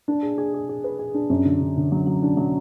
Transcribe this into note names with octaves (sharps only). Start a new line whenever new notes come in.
D4
G#4
G#4
G#4
G#4
B4
G#4
D4
F#2
D3
D3
D3
F#3
F#3
D4
F#3